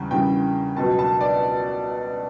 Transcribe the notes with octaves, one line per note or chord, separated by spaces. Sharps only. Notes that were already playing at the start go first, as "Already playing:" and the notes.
Already playing: E2 C#3 G3
E2 C#3 G3 G5
C#2 B2 F#3 A5
A5
D5